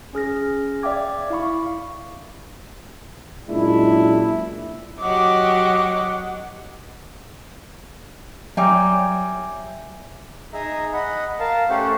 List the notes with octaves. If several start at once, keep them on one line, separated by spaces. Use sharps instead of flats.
C#4 G#4 F6 A#6
D5 E5 F5 G5 D6 G#6
E4 F5 B5 C#6
F#2 A#2 G#3 D4 E4
F#3 G4 D#5 F#5 D6
F#3 G3 D#4 E5 G5 G#5 D6
D#4 G#4 D#5 E5 A#5
D#5 F#5 B5
A#4 F5 A5
A3 C#4 G4 A4 C5 F#5